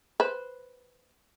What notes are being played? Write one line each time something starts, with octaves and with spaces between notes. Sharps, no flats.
B4 C5